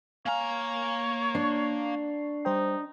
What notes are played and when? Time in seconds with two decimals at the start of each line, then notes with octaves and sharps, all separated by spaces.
0.26 A#3 C#5 F5 G#5 A#5 F6
1.35 D4 D5 C#6 C7
2.45 G3 D#4 C5 G5